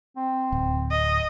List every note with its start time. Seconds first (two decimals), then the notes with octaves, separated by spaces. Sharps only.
0.17 C4
0.52 D1
0.91 D#5